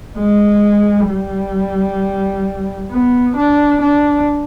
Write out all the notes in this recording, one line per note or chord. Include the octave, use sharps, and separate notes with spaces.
G#3
G3
B3
D4
D4